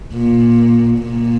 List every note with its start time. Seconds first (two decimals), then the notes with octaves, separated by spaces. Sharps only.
0.14 A#2
0.99 A#2